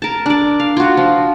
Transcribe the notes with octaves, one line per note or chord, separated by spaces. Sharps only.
A#4 A5
D4 D5
F5
F4 F#4
F3